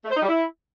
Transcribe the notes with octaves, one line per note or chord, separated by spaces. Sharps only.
A3
C5
D#4
G3
E4